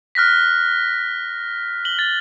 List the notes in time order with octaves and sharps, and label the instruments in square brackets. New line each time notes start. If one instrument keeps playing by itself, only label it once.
[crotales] F6 F#6 A#6 B6
F#7 G7
A6